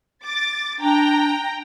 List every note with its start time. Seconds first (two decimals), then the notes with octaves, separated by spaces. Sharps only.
0.24 D6 A6
0.81 D4 G5 A#5